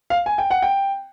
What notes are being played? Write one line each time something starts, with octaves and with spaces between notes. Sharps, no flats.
F5
G#5
G5
F#5
G5